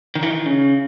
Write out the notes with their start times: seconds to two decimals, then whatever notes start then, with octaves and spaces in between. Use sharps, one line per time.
0.15 D#3
0.23 E3
0.30 D#3
0.46 C#3